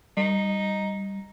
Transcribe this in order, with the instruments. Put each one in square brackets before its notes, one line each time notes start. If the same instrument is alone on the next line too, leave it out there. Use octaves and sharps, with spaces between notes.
[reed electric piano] G3 [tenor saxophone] D#4